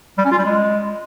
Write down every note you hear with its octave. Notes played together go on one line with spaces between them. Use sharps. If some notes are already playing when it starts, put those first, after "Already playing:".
G3
C#4
F4
G3
G#3